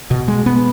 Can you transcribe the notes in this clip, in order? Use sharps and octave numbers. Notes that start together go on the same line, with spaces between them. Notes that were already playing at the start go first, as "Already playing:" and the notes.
B2
G#3
B3